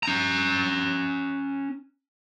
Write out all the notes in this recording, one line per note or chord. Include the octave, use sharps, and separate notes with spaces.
C#4 A#5